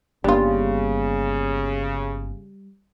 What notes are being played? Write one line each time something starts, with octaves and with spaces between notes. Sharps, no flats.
G1 C#3 G3 A#3 B3 D4 F4